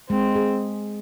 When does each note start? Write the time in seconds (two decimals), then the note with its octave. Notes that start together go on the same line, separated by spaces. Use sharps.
0.10 G#3 C4
0.36 G#4